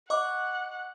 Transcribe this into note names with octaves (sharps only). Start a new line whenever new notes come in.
D#5 F#5 C#6 D6